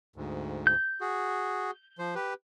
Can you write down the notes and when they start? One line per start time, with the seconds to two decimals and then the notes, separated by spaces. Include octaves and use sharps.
0.16 D2 G#2
0.67 G6
1.01 F#4 G#4
1.99 F3 C5
2.15 G4 B4